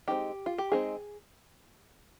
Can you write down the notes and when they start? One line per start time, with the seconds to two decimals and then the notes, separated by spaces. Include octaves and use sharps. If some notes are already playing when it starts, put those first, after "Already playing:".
0.08 G#3 C4 D#4 G4
0.46 F4
0.58 G4
0.72 G#3 C4 D#4 G#4